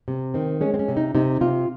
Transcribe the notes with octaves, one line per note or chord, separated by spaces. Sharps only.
C3
D#3 C4
G#3 C#4
C4
C#4
C3
D#4
C3 D#4
C3 F4